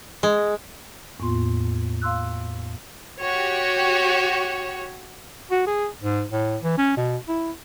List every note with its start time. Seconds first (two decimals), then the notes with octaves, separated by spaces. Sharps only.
0.23 G#3
1.19 E2 A2 A#3 B3 F4 C6
2.02 F5 C6 E6 F#6
3.21 F#4 G4 C#5
5.51 F#4
5.67 G#4
6.02 G#2
6.31 A2
6.62 E3
6.78 C#4
6.97 B2
7.28 E4